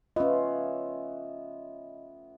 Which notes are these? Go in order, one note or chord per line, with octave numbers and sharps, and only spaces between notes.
A3 B3 C#4 F4 D#5